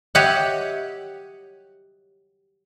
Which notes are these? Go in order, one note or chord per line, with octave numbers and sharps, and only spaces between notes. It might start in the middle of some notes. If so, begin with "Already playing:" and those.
G4 C#5 D#5 E5 F#5